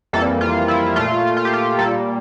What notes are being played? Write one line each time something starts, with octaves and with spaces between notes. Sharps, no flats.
F2 E3 G3 A#3 A4
F4
E4
A#2 A3 F4
F4
G4
F4
A#2 G3 A#3 A4